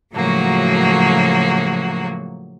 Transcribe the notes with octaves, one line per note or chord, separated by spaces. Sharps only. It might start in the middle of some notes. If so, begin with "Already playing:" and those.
A2 C#3 F3 F#3 A#3 F#4